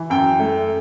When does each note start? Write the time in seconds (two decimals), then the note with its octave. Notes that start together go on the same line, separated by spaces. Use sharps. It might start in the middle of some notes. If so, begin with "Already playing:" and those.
Already playing: E3
0.10 F#2 G5
0.40 A3